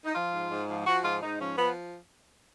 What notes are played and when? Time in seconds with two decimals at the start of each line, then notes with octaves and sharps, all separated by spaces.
0.05 D#4
0.15 F3 F4
0.33 G#2
0.50 G#2
0.69 F3
0.86 F3 F#4
1.04 G#2 F4
1.23 G#2 D#4
1.40 F3 C#4
1.58 F3 B3